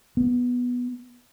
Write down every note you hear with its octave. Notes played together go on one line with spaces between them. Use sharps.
B3